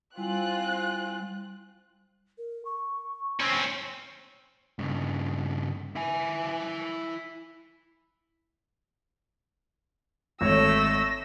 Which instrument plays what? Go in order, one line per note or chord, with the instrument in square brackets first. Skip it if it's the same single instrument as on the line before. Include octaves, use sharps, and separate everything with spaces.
[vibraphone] G3 E4 G#5 [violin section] C4 F4 F#6
[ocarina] A#4
C#6
[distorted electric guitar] C4 C#4
[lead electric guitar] G2 C#3
E4 G#5
[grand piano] G#1 C#5 [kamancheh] A3 E6 [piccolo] A#6